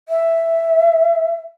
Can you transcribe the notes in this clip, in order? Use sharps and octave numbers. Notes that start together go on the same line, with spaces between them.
E5